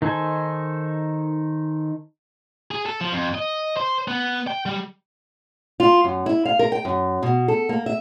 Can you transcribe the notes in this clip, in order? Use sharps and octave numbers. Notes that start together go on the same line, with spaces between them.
D#3 D#4 A4 C5 G#5
G#4
A4
F3
F2
D#5
C5
B3
G5
G3
F4
F#2
E4
F5
A#4
G5
F#2
B2
A4
A#3
E5